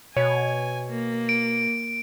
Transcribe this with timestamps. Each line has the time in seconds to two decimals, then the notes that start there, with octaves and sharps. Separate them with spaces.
0.17 B2 C#5 G#5
0.89 A#3
1.29 D7